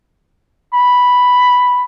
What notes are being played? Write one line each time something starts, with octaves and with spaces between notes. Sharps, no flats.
B5